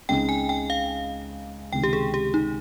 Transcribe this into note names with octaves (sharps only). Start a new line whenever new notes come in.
C#2 C#3 G#3 C4 D#4 G5
G#5
G5
F5
C#2 C3 D#3 G#3 G5
G4
G#4
G4
D#4